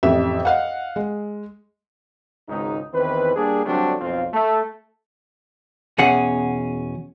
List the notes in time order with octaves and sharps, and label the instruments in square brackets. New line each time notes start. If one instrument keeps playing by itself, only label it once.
[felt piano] A1 F2 G4 E5
D#5 F5 F#5
G#3
[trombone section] G#1 C#2 G#2 D#4
E2 D#3 E3 C4 B4
G3 A#3 D4 G#4
D3 F#3 G3 A3 C4 D4
B1 F2 C4 F4
A3
[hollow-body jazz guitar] E2 B2 C#4 G#4 F#5